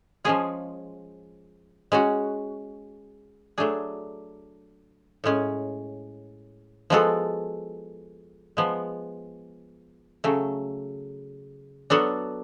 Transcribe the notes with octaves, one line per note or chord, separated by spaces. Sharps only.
F3 G#3 C#4 F4 G#4
G#3 C#4 F#4
F#3 A3 D4 G#4
A2 G#3 C#4
F3 G#3 B3 F#4 A4
F3 G#3 B3
C#3 F#3 A3
F#3 B3 D4 F#4 A4